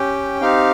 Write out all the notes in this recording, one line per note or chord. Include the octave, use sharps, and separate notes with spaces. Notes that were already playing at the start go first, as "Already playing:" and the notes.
Already playing: C#4 G4 G5
C4 D#4 G4 F5